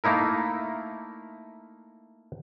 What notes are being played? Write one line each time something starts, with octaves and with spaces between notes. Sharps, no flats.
A3 A#3 D#4 E4 A#4